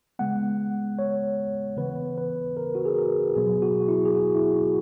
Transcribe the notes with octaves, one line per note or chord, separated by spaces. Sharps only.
C#3 G#3 B3 F#5
C#5
C#3 E3 B3 B4
B4
A#4
F#4
G#4
A#4
B2 F#3 B3 G#4
F#4
F#4
E4
G#4
F#4
E4
F#4